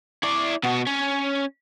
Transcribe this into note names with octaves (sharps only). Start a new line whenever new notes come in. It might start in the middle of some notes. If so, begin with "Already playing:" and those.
E4 D5
B2 F#4
C#4